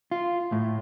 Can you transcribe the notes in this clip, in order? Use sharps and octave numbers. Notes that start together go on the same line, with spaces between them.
F4
A2